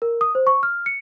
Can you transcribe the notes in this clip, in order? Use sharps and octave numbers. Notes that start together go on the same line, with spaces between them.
A#4
D#6
C5
C#6
F6
C#7